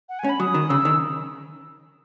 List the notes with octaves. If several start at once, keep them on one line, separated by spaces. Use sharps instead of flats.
F#5
G#5
C#4
B5
F#3 D#6
D#3
C#3 E6
D#3